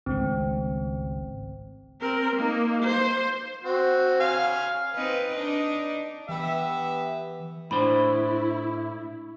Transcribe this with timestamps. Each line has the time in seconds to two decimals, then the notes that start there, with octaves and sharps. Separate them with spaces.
0.06 G#1 C#2 A3 C4
2.01 C4 A#4
2.36 A#3 D#4
2.83 C5
3.64 C4 F#4
4.20 F5 G#5 F6
4.94 C4 D#4 B4
5.36 D4 D#4
6.29 E3 B3 G4 E5
7.71 A2 D4 E4 C5 B5